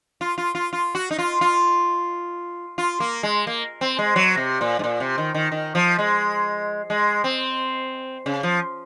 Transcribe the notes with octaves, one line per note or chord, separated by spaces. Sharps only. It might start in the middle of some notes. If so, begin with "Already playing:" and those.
F4
F4
F4
F4
F#4
D#4
F4
F4
F4
A#3
G#3
A#3
C4
G#3
F#3
C3
A#2
G#2
A#2
C3
D#3
D#3
D#3
F3
G#3
G#3
C4
C#3
F3